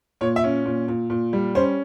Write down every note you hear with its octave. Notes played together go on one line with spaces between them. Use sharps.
A#2 C#5
E5
C#4
A#2
A#2
A#2
G3
C#4 C5